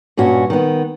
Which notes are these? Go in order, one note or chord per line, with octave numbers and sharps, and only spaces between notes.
G2 A#2 C#4 F#4
D#3 B3